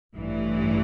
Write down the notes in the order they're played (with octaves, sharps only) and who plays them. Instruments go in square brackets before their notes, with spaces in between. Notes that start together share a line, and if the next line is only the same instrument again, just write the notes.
[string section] A1 G2 E3